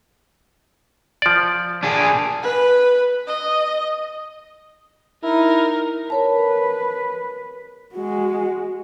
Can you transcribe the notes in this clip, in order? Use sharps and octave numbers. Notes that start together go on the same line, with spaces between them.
F3 D5
D4 G#4
B4
D#5
D#4 E4 A#4
A#4 B4 C#5 A5
G#3 F#4